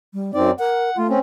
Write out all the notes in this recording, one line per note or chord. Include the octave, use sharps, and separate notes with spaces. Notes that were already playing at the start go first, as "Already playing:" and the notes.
G3
F#2 C4 D#4 D5
A#4 F#5
A3 F4
C4 C#4